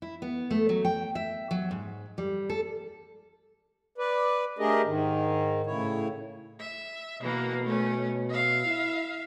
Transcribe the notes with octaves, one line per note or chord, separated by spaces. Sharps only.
E4
B3
A3
F#3
G5
E5
F#3
G#2
G3
A4
B4 D5
A3 D4 G4 G#4 A#4 D#5
G#2 D#3
A2 C#3 E4 C#5
E5
B2 E3 A#3
A3 C#4
E5 F5
E4